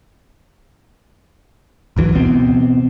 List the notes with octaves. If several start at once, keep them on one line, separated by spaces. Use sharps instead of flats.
G#1 D2 E3 F#3
B2 E3 B3 C4